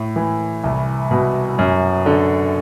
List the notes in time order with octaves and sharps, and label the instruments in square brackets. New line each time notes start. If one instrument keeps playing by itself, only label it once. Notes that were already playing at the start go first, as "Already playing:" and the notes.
Already playing: [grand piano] A2
E3
C2
B2
F#2
D3